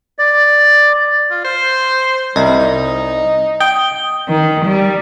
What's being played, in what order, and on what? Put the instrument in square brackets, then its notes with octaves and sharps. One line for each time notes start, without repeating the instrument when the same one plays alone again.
[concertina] D5
[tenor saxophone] F4
C5
[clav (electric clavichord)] C2 [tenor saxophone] G3 [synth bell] D#5
[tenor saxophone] D#4
[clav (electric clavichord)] G5 [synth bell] D#6 G7
[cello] D#3
G3